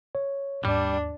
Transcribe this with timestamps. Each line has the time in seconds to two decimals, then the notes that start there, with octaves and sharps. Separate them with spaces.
0.15 C#5
0.65 D#2 G#2 G3 D4